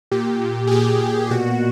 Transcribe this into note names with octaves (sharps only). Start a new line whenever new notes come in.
A#2 G4
A#2
G#4
A#2 G4
A#2
B2 F#4